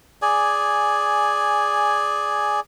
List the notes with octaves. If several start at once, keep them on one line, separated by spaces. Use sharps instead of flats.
G#4 D5 G#5